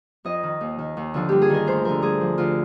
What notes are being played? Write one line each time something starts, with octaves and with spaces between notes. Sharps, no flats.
F2 D#5
D#3
D#2
D#3
D#2
D3 F3 F4
G2 G4
G#4
D#3 A#4
D2 C5
D3 F3 A#4
G2 G#4
F3
D2 F4